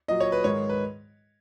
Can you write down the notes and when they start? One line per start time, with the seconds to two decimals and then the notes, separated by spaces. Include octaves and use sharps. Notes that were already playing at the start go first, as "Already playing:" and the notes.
0.08 A#2 F#3 D#5
0.20 C#5
0.32 B4
0.44 G#2 D#3 G#3 C#5
0.69 B4